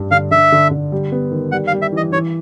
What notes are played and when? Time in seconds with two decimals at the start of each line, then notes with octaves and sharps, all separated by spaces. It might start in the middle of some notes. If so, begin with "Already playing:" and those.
Already playing: G2 G3
0.11 D3 F5
0.31 D3 E5
0.52 D3
0.71 D3
0.92 G3
1.12 B3
1.32 D#3
1.52 G3 F#5
1.67 F5
1.73 G3
1.82 E5
1.93 E3 D#5
2.12 E3 C#5